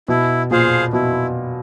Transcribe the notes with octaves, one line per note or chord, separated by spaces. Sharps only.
B2 E4
A#2 G#4 C5 F5
B2 E4